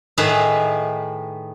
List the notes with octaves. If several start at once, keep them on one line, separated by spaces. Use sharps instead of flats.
A2 D#3 G#4 B4 E5